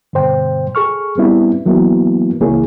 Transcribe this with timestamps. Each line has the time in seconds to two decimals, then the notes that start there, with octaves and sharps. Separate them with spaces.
0.13 G2 B2 D3 C5 G5
0.75 G#4 A4 C#6 F6
1.18 G3 B3 C4 D4 E4
1.66 E3 F#3 A#3 B3 E4
2.41 C#2 E3 A#3 E4 G#4 C#5